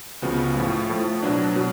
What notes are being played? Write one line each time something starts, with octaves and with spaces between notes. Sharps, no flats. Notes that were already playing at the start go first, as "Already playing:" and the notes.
C#2 C#3 F3 B3 F#4
A2 F3 A3
A2 F3 A3
B2 F#3 B3 D4
B2 F#3